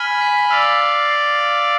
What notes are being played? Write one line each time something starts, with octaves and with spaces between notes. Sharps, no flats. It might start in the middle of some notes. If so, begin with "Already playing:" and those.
Already playing: G#5 B5 F6
B6
D5 F5 E6
A6
C7
A6